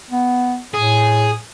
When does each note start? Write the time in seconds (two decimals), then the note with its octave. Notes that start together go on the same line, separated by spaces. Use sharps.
0.10 B3
0.74 A2 G#4